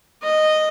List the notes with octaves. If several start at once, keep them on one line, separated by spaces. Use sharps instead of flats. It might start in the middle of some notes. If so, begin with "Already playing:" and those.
D#5